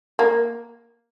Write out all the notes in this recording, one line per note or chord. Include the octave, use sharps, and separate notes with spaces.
A#3